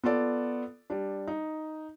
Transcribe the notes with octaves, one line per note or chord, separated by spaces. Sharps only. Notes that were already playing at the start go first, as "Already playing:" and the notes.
B3 F4 A4 D5
G3 D4
D#4